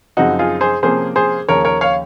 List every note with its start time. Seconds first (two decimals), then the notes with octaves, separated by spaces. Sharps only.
0.17 F#2 C#3 F3 C4 D#4 F#4
0.39 F4 G#4
0.61 G#4 C5
0.83 C3 F3 A#3 C#4 G#4 C5
1.16 G#4 C5
1.48 D#2 C#3 F3 A#4 C#5
1.65 A#4 C#5
1.81 C#5 F5